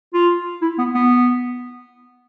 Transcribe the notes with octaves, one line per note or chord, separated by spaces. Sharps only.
F4
E4
B3
B3